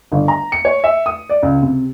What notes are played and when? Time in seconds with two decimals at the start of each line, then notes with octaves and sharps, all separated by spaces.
0.12 G1
0.28 A#5
0.52 C#7
0.65 C#5
0.84 E5
1.06 D#6
1.29 D5
1.43 C#2
1.62 C3